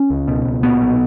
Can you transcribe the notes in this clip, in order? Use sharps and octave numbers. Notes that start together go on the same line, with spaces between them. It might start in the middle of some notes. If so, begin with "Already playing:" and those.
Already playing: C#4
C#2
B2
C#2
A#2 B3
B1